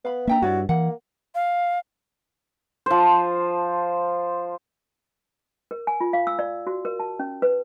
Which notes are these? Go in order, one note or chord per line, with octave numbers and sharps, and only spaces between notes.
B3 F5 B5
A#3 D4 E5 G5 A#5
G2 E4 F#4 C#5 D5
E3 A#3 F#5
F5
F3 C5
A#4
G#5
F4
F5
E6
D5
F#4
A#4
A5
C#4
B4